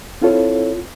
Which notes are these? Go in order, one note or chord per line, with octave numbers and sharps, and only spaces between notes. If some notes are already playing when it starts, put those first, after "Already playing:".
C4 E4 F4 A4 C#5